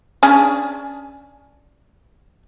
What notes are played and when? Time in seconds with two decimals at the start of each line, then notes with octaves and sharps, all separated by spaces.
0.23 C#4 D4 G#4